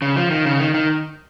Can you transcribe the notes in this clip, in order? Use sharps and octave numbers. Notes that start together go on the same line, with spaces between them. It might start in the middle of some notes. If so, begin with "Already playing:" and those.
C#3
F3
D#3
C#3
D#3
D#3